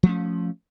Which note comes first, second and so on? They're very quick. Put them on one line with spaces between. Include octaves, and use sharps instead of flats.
F3 A3 C#4